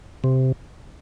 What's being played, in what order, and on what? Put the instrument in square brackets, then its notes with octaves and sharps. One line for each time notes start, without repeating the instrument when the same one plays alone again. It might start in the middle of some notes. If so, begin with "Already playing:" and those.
[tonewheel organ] C3